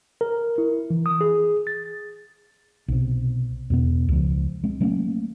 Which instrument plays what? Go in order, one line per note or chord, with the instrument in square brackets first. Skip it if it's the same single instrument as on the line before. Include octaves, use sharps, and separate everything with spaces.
[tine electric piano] A#4
E4
E3
D#6
G#4
A6
[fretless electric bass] B1 C3
E2 B2 B3
C#2 F3
G#3 C4
F#3 A3 A#3 C#4